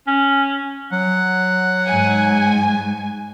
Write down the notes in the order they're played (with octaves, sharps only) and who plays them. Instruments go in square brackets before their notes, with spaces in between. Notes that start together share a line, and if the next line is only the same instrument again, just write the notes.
[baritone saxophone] C#4
[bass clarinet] F#3 [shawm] F#5
[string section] G#2 G#5